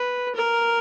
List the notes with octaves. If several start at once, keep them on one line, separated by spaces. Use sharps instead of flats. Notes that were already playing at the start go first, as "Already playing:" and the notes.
Already playing: B4
A#4